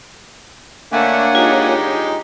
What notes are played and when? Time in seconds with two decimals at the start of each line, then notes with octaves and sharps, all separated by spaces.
0.92 D3 A3 A#3 D4 C#5 F#5 G#5
1.35 G#3 D#4 F4 G4